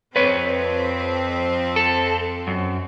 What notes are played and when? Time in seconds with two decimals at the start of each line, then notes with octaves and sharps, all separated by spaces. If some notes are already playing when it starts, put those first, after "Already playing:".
0.16 F2 C4 B4 C#5
1.76 A4
2.47 F#2